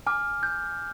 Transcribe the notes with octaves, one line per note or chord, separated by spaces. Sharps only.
G#5 D6 F6
G6